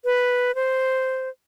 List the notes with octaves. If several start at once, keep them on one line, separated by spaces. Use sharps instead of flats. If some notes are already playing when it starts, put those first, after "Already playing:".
B4
C5